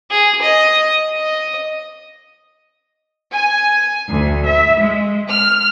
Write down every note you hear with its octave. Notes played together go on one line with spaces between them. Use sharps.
G#4
D#5
D#5
G#5
D2
E5
G#3
F6